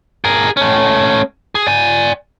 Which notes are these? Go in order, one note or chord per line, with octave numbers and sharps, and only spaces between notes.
G#4 A#4
A3 C#4
G#4
D5 G#5